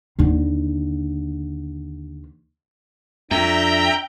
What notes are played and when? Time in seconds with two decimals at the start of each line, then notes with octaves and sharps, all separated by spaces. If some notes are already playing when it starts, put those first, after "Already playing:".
0.19 D#2 D3
3.31 F2 D4 E5 G5 A#5